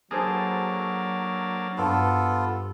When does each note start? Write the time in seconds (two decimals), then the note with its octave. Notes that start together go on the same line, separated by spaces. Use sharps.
0.11 F#3 A#3 D4 G#4 A4 C5
1.78 G2 B3 F4 A4